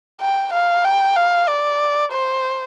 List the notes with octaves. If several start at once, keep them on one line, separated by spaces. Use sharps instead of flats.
G5
F5
G5
F5
D5
C5